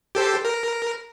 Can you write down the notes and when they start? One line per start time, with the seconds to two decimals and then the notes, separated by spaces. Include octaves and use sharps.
0.15 G4 A4 C5
0.45 A#4